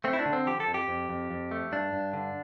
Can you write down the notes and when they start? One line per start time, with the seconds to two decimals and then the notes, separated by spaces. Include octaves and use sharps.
0.04 A3 C4
0.13 E4
0.19 D4
0.26 D3
0.33 C4
0.46 F3 G4
0.60 A4
0.68 F2
0.74 G4
0.88 F2
1.09 F2
1.31 F2
1.51 A3
1.72 G2 D4
1.93 G2
2.13 D3